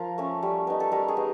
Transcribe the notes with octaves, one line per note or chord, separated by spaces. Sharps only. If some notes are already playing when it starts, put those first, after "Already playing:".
Already playing: F3 A#4
A3 C#4
G3
B3 D#4
A4
G3 A#4
G#4
B3 D#4